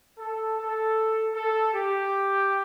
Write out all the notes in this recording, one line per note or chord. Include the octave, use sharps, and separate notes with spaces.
A4
A4
A4
G4